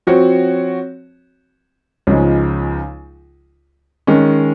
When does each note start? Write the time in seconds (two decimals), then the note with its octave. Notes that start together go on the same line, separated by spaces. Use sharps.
0.07 F3 C4 F#4 C#5
2.07 C#2 C#3 F3 G#3 D#4
4.07 D#3 G#3 C#4